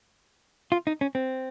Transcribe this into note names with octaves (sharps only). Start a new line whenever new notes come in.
F4
D#4
C#4
C4